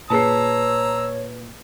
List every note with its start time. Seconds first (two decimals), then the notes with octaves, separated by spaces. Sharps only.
0.10 A#2 G#4 B4 C#5 A5 A#5 E6 C7